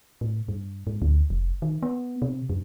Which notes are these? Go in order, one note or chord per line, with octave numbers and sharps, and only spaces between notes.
A2
G2
G#2
D2
F1
D#3
B3
C3
F#2